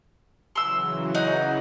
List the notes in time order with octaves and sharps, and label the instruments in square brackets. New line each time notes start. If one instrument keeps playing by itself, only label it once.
[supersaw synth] C#3 E3 F#3 [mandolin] C6 E6
[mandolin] D#4 F#5